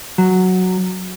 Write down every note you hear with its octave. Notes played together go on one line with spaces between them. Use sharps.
F#3